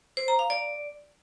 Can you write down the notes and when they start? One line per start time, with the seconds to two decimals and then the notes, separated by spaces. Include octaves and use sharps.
0.17 C5
0.28 A#5
0.39 F5
0.50 D5